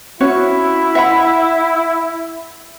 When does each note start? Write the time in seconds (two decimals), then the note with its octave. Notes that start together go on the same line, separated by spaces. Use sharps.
0.21 C#4 E4 F#4 C#5
0.95 E5 F#5 B5